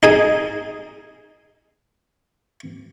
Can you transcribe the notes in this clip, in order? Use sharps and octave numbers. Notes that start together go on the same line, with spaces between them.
D#4 G#4 G#5